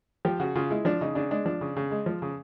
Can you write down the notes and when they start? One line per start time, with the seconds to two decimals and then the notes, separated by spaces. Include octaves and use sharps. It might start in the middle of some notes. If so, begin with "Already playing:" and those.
0.25 F3 G4
0.39 C#3 F#4
0.55 C#3 F4
0.70 G#3 E4
0.85 F3 D4
1.01 C#3 D#4
1.15 C#3 D4
1.31 G#3 D4
1.46 F3 D4
1.61 C#3
1.77 C#3
1.91 G#3
2.06 F3
2.22 C#3